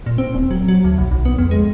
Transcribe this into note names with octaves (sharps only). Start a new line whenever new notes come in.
A#2
C4
D1
F#3
F#3
D2
B1
B1
B3
F2
G#3